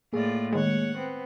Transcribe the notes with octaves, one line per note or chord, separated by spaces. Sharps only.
A2 A#3 F4 G#4 D5
D#3 G#3 C#5 F#5
B3 C4